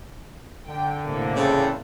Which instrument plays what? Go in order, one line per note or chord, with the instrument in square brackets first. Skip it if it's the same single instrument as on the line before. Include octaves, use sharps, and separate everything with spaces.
[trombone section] D3 [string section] G5
[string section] A2 C3 A#3
[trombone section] E2 C4 A4 [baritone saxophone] C#3